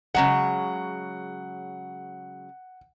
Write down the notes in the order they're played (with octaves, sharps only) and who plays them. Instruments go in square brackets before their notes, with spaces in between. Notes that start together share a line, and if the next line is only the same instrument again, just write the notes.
[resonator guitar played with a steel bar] C#3 F#3 G#3 [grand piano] F#5